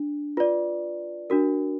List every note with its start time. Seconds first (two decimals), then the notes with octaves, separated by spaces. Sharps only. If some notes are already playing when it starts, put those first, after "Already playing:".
Already playing: D4
0.37 F4 B4 D5
1.30 D4 F#4 A#4